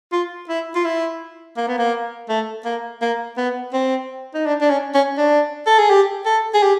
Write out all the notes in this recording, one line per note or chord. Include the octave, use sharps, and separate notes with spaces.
F4
E4
F4
E4
A#3
B3
A#3
A3
A#3
A#3
B3
C4
D#4
D4
D4
C#4
C#4
D4
A4
G#4
G4
A4
G#4
G4